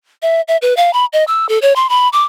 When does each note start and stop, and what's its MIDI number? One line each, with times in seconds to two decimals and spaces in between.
0.22 0.41 76
0.48 0.57 76
0.62 0.74 71
0.77 0.93 77
0.93 1.05 83
1.13 1.24 75
1.28 1.47 88
1.49 1.59 69
1.62 1.73 73
1.76 1.89 84
1.89 2.09 83
2.13 2.25 86